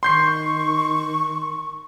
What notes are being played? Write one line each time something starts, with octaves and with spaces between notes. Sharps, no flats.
D#3 C6 C#6 G6 C7